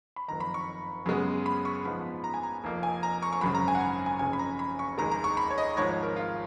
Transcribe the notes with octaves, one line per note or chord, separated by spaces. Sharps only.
B5
F#1 F2 D#3 A#5
B5
C#6
F#2 C#3 G#3 B3
B5
C#6
A#1 G#2 F3 B3 B5
A#5
G#5
A#5
F1 F2 F3 A#3
G#5
A#5
C#6
C#6
G#1 F#2 C#3 B5
A#5
G#5
F#5
G#5
G#5
F#1 F2 C#3 G#5
B5
A#5
B5
C#6
F1 D#2 D#3 G#3 A#5
A#5
C#6
B5
C#5
D#5
G#1 G#2 F3 C#5
C#5
A#4
F4